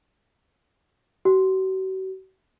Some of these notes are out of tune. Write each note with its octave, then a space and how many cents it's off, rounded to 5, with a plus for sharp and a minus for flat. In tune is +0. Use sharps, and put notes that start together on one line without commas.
F#4 +40